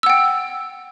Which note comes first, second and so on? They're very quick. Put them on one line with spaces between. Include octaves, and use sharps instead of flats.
E6 F#5 G5